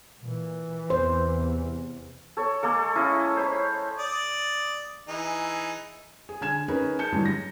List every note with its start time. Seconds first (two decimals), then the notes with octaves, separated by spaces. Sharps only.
0.22 A#2 E3
0.90 E2 C3 C5
2.37 A4 C#5
2.63 G#3 A#3 A4
2.95 C#4 E4 D#5 F5
3.37 C5 C#5 B5
3.98 D5 D#6
5.08 E3 D#4 G#4
6.29 G#4
6.41 D3 G#5 G#6 E7
6.68 C#4 D#4 G#4 A#4 B4
6.99 A5 G6 C#7
7.12 G2 D3 E3 F#3 G#3
7.25 A#6